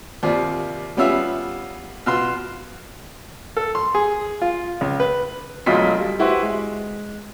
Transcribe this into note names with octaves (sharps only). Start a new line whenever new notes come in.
D#2 C3 F4 D5
G3 B3 C#4 F4 E5
B2 F4 F5 C6
A4
C6
G#4
F4
C#2
B4
E1 D2 F#3 F4 D#5 B6
G3
E4 F#4 G4 B4 C5 E5
G#3